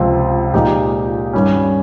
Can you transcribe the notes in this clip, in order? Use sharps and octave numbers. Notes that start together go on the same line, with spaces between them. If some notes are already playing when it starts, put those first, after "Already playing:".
Already playing: C#2 C3 F3 C4 F4
A#2 F3 G#3 D#4 G4
G2 D#3 G3 C#4